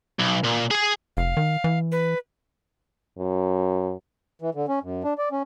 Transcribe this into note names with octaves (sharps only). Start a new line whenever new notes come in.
B1
A#2
G#4 G#5
F1 F5
D#3
E3
B4
F#2
E3
D3
C#4
F#2
D4
D5
C#4